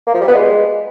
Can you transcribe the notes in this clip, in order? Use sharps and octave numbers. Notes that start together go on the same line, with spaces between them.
A#3
F3
G3
B3
G#3